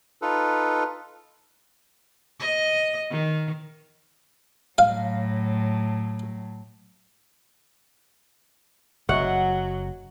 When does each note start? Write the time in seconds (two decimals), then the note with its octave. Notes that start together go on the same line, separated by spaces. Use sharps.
0.22 D#4 F4 A4 B4
2.40 D#5
3.11 D#3
4.78 A2 F#3 F5
9.09 F#1 F#3 D#5 E5 F#5 C#6